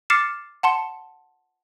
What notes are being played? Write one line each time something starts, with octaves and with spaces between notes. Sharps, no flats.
D6 F6 A6 C7 C#7 E7
F#5 A5 C6 C#7